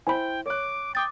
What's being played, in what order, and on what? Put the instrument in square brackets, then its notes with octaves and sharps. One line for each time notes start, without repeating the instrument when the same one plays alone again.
[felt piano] E4 C5 [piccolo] G5 [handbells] G#5 B5
[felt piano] C#5 F#6 [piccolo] D6
[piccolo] G5 [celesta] D6 D#6 A6